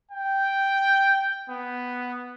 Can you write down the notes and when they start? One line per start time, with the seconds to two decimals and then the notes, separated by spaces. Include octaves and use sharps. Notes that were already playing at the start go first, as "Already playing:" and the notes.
0.11 G5
1.50 B3